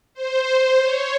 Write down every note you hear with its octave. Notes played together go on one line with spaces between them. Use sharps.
C5
C#5